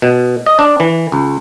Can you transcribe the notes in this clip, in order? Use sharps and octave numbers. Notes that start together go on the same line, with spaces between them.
B2
D#5
D4
E3
C#2